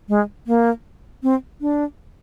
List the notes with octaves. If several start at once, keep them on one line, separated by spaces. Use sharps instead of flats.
G#3
A#3
C4
D4